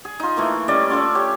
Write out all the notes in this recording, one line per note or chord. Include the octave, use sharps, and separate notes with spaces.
G#4
D#4 F4
E3 A3 A#3
G3 C#4 D5 D#5
C#4 F4 A4 D5
G4 C#5